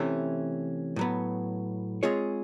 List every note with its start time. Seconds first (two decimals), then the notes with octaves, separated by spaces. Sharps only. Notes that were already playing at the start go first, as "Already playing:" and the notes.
Already playing: C3 E3 A3 C#4
0.96 A2 F#3 B3
2.03 G#3 C4 F4 G#4 C#5